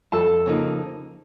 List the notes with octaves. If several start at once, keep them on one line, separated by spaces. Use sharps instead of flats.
F2 A4 A5
C#3 F3 A#3 D#4